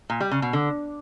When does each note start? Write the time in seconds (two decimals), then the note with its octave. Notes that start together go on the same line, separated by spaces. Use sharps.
0.10 A#2
0.20 G3
0.31 C#3
0.42 B2
0.53 D3